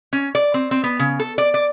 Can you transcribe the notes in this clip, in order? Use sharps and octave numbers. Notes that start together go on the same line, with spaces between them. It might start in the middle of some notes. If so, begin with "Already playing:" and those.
C#4
D5
C4
C4
B3
C#3
A4
D5
D5